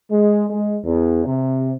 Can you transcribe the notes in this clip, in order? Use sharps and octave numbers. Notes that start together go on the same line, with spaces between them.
G#3
G#3
E2
C3